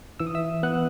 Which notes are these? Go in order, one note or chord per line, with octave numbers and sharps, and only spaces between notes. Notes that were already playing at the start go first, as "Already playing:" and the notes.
E3 E6
D#6
E5 E6
B3 F#5 F#6